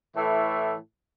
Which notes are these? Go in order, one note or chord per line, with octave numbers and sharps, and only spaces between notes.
A2 E3 A3 E4 A4